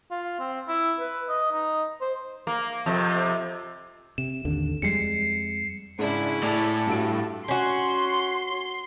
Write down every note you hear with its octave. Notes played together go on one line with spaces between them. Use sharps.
F4
C4
E4
B4
D#5
D#4
C5
A#3
F2 C3
C3 E7
A1 D#2 D3
F2 G3 G#3 C7 C#7
G#2 C#3 C#4 D4 E4
A2 A4 D5
G2 F#4 D7
C#4 F#4 C6